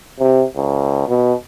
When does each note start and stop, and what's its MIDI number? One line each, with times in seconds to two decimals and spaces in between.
0.19 0.44 48
0.56 1.07 37
1.08 1.33 47